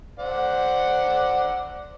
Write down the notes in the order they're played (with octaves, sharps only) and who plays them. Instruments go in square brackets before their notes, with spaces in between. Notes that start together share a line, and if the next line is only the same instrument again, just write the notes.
[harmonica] C5 D5 F#5